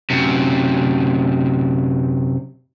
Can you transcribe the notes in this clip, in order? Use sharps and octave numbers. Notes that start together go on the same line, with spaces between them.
F#2 C3